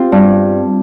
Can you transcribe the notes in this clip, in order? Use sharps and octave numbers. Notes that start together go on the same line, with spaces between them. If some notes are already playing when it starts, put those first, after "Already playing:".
Already playing: C4 F4 G4
G2